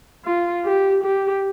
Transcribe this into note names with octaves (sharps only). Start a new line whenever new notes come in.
F4
G4
G4